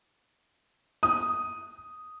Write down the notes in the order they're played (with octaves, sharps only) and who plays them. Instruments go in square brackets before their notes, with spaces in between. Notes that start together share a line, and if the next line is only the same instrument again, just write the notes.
[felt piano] D#6